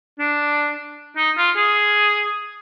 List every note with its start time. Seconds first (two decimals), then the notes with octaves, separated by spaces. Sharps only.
0.19 D4
1.17 D#4
1.38 F4
1.56 G#4